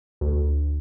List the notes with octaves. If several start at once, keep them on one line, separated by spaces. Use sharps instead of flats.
D2